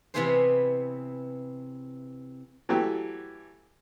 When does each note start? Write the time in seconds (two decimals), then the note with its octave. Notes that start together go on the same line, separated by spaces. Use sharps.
0.14 C3 E3 B3 E4 G#4 C5
2.69 E3 F#3 A3 G4